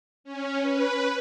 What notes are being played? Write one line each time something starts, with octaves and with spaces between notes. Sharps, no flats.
C#4
B4